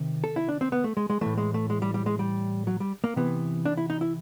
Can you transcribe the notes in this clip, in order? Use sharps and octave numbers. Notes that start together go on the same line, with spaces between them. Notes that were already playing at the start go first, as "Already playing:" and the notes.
Already playing: C3 D#3
A4
E4
D4
C4
B3
A3
G#3
G#3
A2 E3 A3
G#3
A3
G#3
G3
G3
G#3
G3
F#3
G3
A#3
C3 E3 B3
D4
E4
D#4
E4